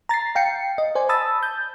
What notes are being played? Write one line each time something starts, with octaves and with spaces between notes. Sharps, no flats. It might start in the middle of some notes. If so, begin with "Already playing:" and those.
A#5 A6 A#6 C7
F5 G5 C7 C#7
D#5
C5 D5 G#5
A5 B5 D#6 E6 A6
G6